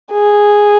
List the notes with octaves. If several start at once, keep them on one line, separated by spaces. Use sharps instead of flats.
G#4